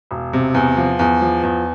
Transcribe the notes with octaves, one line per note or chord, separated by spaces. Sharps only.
E1
C3
E2
F3
E2
F3
E2